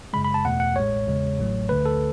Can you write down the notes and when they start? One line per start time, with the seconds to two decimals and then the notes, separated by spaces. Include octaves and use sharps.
0.13 F#2 C#3 G#3 B5
0.24 B5
0.34 A5
0.45 E2 B2 A3 F#5
0.60 F#5
0.76 A1 A2 G#3 C#5
1.07 E2 C#3 G#3
1.38 A1 A2 F#3 A3
1.69 D2 D3 A3 B4
1.85 A4